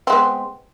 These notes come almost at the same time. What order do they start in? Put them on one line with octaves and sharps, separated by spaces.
C4 G#3 B3